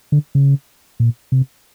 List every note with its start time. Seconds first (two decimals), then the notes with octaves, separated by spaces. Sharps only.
0.12 D3
0.35 C#3
1.00 A#2
1.32 C3